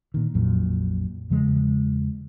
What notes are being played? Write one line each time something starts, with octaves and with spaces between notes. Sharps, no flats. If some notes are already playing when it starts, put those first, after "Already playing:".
A#2 D#3
A#1 F2 A#2 F#3
E2 C#3 F3 G#3